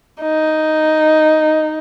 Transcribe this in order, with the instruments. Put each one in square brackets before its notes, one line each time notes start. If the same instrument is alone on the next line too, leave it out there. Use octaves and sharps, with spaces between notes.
[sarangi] D#4